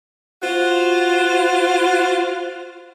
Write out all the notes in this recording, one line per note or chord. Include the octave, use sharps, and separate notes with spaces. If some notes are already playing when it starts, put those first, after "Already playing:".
F4 F#4 C5 F5